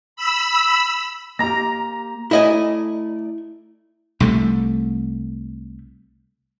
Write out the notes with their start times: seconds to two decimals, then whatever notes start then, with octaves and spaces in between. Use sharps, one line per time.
0.16 B5 E6
1.39 A#3 G4 A#5 A#6
2.31 A3 E4 D5 D#5 G#5
4.20 C2 C3 A3